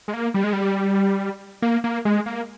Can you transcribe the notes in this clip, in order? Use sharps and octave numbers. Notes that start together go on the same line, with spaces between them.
G#3
A#3
G3
G#3
G3
A#3
A#3
G#3
A#3